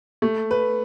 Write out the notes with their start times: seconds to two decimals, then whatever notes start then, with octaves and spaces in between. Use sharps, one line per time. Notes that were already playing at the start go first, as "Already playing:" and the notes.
0.22 A3
0.51 B4